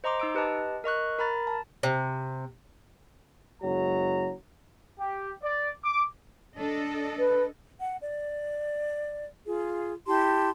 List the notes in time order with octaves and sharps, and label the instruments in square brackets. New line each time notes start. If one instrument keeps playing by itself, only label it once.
[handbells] C5 D#5 A#5 C6 D6
D#4 E6 D7
G4 B4 D#5 A5
A#4 D#5 C#6 F#6
A#4 A#5 B5 A6
A5
[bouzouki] C3
[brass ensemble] F#1 F#3 G#3 A#5
[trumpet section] G4
D5
D6
[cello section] D4 A4 D#5
[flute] B4
[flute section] F#5
D5
F4 G#4
E4 G4 A5 C6